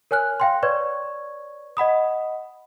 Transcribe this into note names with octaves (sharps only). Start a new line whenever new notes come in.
A#4 C#5 G#5 F6 F#6
F5 G5 C6
B4 C#5 D5 C#6 G#6
D#5 F#5 B5 D#6